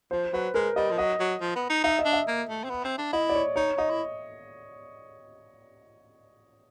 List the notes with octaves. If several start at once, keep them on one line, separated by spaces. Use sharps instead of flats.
F3 C5
F#3 B4
G#3 A#4
G3 D#5
F3
F#3 D#5
F#3
F3
B3
D#4
D#4 E5
D#5
D4
E5
A#3
A3
C4
B3
C4
D4
E4 D#5
D5
C#5
D#4 C#5
D#4 D#5
E4